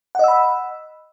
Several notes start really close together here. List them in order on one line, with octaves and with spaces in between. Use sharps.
F#5 D#5 E6 B5